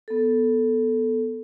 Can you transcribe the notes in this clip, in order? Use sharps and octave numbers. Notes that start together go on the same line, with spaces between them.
B3 A4